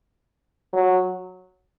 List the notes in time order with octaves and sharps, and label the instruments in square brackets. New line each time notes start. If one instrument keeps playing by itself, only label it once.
[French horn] F#3